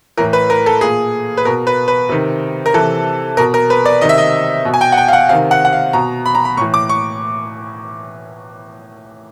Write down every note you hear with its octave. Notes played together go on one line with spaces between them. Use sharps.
A2 E3 A#4
B4
A#4
A4
A#2 G#4
B4
B2 A#4
B4
B4
C3 D#3
A#4
C3 E3 A4
B2 A#4
A#4
B4
D5
C3 D#3 D#5
E5
D#5
B2
G#5
G5
F#5
G5
F5
F#5
C3 D#3 F5
F#5
F#5
F5
B2 A#5
B5
A#5
B5
A2 E3 C#6
D6
C#6